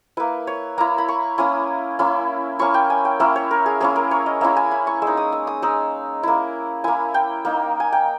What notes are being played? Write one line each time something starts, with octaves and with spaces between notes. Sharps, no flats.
A#3 E4 B4
C#5
A#3 E4 A#5
B5
C#6
A#3 C#4 E4 D#6
A#3 C#4 E4
A#3 C#4 E4 C#6
G5
G#5
G5
A#3 C#4 E4 E5
C#5
A#4
G#4
A#3 C#4 E4 G#4
A#4
C#5
D#5
A#3 C#4 E4 E5
G#5
B5
C#6
G#3 E6
D#4
D#6
E6
D#6
G#3 D#4 E6
A#3 E4
A#3 E4 G#5
G5
A#3 D#4
G#5
G5